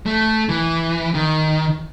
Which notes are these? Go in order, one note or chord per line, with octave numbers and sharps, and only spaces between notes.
A3
E3
D#3